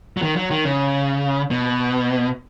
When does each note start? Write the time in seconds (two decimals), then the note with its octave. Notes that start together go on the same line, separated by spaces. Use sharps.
0.17 F#3
0.22 D#3
0.36 F#3
0.51 D#3
0.64 C#3
1.51 B2